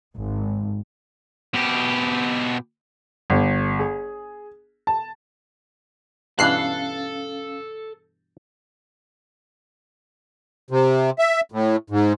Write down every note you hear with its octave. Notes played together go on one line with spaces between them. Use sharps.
G#1
B2 G4
G1
G#4
A5
G2 B2 E3 C#4 A4 F5 F#6 C7
C3
E5
A2
G#2